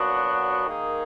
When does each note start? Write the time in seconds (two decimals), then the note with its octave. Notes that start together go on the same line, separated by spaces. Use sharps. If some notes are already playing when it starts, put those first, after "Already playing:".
Already playing: A#2 F#3 B3 D4 F#4
0.66 D#3 A#3 D#4 G#4